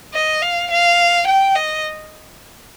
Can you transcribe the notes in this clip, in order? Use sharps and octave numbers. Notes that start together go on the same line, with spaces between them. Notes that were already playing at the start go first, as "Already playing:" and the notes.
D#5
F5
F5
G5
D#5